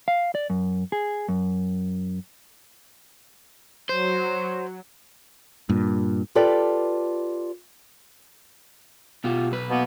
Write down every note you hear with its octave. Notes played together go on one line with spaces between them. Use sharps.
F5
D5
F#2
G#4
F#2
F#3 C5
G2 A#2
F4 G4 A4 B4 D5
B2 F4 G4
B1 B4
B2 A#3 B3